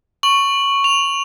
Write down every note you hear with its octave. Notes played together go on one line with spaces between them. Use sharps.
C#6 F#7
F7